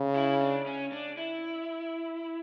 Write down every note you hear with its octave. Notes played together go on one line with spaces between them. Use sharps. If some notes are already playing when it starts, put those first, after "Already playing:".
Already playing: C#3
E4
D4
C#4
D4
E4